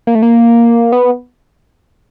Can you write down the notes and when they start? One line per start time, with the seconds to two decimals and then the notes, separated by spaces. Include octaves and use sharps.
0.07 A#3
0.15 A3
0.23 A#3
0.92 B3